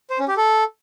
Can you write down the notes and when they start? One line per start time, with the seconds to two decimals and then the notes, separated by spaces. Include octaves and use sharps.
0.10 C5
0.19 C#4
0.28 G4
0.37 A4